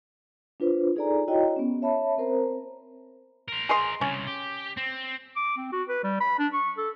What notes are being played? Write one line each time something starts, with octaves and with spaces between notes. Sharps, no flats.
D4 F4 B4 C5
D#4 G#4 A4 D5 G#5 A#5
E4 F#4 C#5 D#5 G5 A#5
B3 C#4
C#5 E5 A5 B5
C4 A#4 C5 A#5
A#4 C5
G#4 D#5 C6
C2 C#3 C#4
G4
C4
D6
C4
F#4
B4
G3
B5
D4
C#6
A4